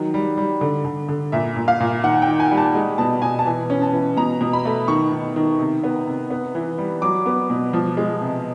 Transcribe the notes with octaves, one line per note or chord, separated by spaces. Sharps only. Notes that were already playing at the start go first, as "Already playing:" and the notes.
Already playing: D#3 F#3
G3
G3
D3
D3
D3
A#2 E5
A#2
F5
A#2
D#3 F#5
G5
D#3
G#5
G3
A5
G#3
B2 A5
B2 G#5
A5
E3 G#5
C#4
A5
E3
B2 A#5
B2
B5
A3
D#3 C#6
D#3
D#3
C3
B3
C3
B3
E3
G3
F#3 D6
B3
B2
F3
G#3
C3